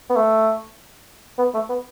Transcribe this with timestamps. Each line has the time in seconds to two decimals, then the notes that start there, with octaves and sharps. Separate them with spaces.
0.10 B3
0.16 A3
1.39 B3
1.54 A3
1.69 B3